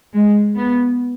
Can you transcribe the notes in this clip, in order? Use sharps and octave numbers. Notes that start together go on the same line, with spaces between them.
G#3
B3